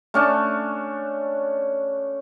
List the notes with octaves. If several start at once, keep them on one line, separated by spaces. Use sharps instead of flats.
A3 C#4 D4 A5